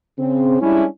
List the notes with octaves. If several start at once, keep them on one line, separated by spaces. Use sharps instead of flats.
C#3 C4
G3 G#3 C#4 D4 E4